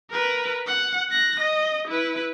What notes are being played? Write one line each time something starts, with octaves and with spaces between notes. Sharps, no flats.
A#4 B4
F#5
F#6 A#6
D#5
E4 B4